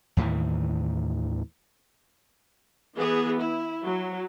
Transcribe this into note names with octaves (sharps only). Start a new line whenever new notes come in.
D#2 A2 D#3 E3
E3 B3 G#4
E4
F#3